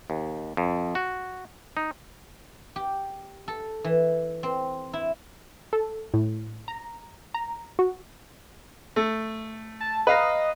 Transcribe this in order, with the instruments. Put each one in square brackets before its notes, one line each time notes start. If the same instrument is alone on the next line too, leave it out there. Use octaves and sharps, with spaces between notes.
[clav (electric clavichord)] D#2
F2
F#4
D#4
[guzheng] G4
A4
E3
C4
E4
[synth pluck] A4
A2
A#5
A#5
F#4
[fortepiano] A3
[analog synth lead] A5
[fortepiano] B4 F5 A#5 [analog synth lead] D#5